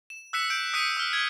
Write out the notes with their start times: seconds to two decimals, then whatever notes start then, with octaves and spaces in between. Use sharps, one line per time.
0.10 E7
0.33 E6 F#6 B6 C#7 E7
0.50 G6 D7
0.73 D#6 F#6 B6 C#7 D#7
0.97 E6 F6
1.13 G#6